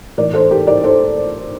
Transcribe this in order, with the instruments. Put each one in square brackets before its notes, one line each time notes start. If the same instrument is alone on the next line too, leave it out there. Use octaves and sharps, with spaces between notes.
[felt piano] A2 E3 A#4 D5
A4 C5
G4 A#4
A#4 D5
A4 C5